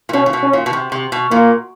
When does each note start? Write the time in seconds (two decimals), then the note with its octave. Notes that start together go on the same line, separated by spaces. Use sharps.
0.09 A#2
0.13 B2 C#4
0.26 A#2
0.33 B2
0.43 C#4
0.53 A#2
0.66 B2
0.73 C3
0.92 C3
1.12 B2
1.31 A#2 A#3